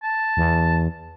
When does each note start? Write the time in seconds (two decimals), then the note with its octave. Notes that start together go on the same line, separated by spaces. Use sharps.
0.03 A5
0.37 E2